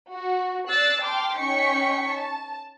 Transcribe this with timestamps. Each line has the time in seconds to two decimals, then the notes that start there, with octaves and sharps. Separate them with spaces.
0.11 F#4
0.68 D5 E6 F#6 A6 C7
1.01 G5 A5 C6 D6 F6
1.38 C#4 D#4 G5 C#6 B6 C#7
2.11 A5